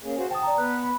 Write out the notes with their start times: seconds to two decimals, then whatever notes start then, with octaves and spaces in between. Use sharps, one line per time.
0.03 A#3 C#4 G#4
0.17 F#4 C5
0.31 G5 A5 D#6
0.43 D5 A#5
0.58 B3 B4 F#6
0.84 B5